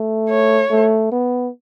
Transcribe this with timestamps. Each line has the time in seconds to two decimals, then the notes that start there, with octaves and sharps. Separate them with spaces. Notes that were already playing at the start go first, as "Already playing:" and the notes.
Already playing: A3
0.30 C#5
0.70 A3
1.12 B3